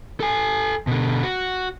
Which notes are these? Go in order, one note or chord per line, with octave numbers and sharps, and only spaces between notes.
A4 G#5
B2 D3
F#4